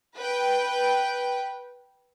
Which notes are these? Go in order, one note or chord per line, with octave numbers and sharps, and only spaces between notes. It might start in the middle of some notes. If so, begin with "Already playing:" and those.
B4 G5